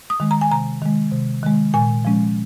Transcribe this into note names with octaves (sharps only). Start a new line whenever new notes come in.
D#6
D#3 G#3
A#5
G#5
C3 A#5
D#3 G#3
C3
D#3 G#3
A#2 G#5
F3 G#3 C#4